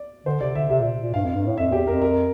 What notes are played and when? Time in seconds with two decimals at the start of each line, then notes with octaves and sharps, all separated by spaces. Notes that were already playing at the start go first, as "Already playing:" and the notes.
Already playing: D5
0.26 D3 C5
0.41 C3 D5
0.55 D3 E5
0.70 C3 E5
0.81 A#2
1.02 A#2
1.14 G2 F5
1.25 F2
1.36 G2
1.46 A2
1.57 F2 E5
1.72 E2 G4
1.87 F2 A#4
2.02 A#4